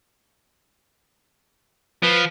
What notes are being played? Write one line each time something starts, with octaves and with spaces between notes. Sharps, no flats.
F3 B4